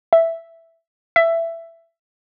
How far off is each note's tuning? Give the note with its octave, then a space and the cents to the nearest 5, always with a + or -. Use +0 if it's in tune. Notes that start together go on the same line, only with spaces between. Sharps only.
E5 +5
E5 +15